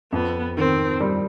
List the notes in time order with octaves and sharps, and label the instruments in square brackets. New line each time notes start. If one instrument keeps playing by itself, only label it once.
[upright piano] F2 [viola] B3
[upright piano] D#3 [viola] C4
[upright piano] G3